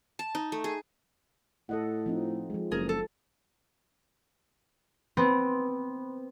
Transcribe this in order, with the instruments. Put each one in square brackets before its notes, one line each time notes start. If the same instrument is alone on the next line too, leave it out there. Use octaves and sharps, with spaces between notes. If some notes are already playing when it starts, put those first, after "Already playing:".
[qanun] A5
D#4
A3
G#4
[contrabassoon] A2 [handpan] A4 D#5 F#5
[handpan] F3 C4 D#4
F3 G#3
[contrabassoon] F#1 [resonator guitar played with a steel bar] G#4 A#4
[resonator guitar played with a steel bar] A4
[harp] B3 C4